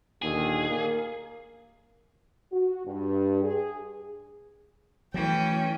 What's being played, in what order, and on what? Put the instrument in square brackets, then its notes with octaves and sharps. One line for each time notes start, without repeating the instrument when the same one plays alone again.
[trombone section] D#2 A#2 D3 [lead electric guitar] G#4
[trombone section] A#3
[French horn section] F#4
G2
G#4
[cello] E3 C#4 [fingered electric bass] F#3 A3 [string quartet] G5